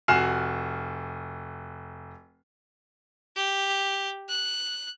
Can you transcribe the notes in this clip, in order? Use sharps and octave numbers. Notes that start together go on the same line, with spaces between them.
F1 F#4 G#5 F6 C7 E7
G4
F#6